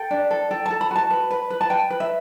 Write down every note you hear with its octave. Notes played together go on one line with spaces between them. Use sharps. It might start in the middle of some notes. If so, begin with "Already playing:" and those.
Already playing: A4 G5
D4
A4
A4 G5
A4 A5
B5
F#4 A5
B4
B4
B4
A5
B4 G5
B4
E5